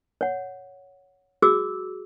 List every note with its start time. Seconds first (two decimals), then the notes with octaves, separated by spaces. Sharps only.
0.21 C#5 F#5
1.42 F#4 G#4 D6 E6